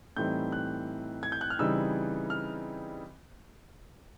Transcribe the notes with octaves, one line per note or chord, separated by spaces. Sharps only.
A2 E3 G3 C4 D#4 G6
F#6
G#6
G6
F#6
F6
C#3 E3 G3 C4 D#4 E6
F6